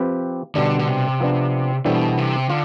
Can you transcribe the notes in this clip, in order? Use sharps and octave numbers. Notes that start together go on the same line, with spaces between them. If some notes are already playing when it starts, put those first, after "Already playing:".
Already playing: F3 C4 G4 B4
B2 D3 G3 D4
D3
C3
F3 B3 D4
B2 E3 G3 D4 A4 C5
C3
D3 F4